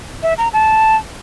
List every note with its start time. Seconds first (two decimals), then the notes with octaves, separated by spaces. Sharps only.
0.23 E5
0.38 A#5
0.53 A5